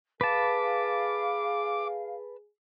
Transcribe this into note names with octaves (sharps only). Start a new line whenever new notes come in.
G#4 B4 F5 A5 D6